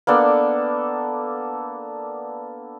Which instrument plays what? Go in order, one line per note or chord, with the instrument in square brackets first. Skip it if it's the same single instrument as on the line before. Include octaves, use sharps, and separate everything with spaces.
[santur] A#3 B3 D4 A4